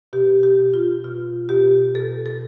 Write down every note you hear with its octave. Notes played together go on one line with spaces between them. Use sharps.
B2 G4
G4
B2
F4
B2 F4
B2 G4
B2 A4
A4